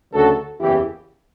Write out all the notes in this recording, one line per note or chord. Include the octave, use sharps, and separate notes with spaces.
D2 C#3 F#3 F#4 A4
F#1 E2 C#3 E3 E4 G4